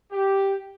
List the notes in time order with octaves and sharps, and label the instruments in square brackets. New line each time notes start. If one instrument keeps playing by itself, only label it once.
[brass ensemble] G4